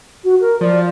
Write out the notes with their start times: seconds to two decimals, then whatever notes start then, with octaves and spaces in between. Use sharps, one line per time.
0.23 F#4
0.40 A#4
0.61 F3 D5